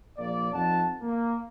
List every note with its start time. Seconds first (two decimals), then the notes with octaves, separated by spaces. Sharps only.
0.17 A#1 A#3 D5
0.53 F2 D#4 F#5 A5
1.01 A#3